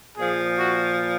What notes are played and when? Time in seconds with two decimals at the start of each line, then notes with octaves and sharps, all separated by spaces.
0.18 A#2 F3 G#4
0.59 F#4